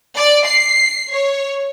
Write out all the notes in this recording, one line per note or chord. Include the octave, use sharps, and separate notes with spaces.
D5
C7
C#5